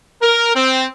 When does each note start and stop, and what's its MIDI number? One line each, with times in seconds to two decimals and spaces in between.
0.22 0.55 70
0.56 0.86 60